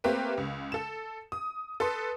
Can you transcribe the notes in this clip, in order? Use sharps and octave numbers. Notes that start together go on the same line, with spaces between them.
A3 A#3 C4 G4 A#4 B4
C#2
A4 E7
D#6
A4 B4 C6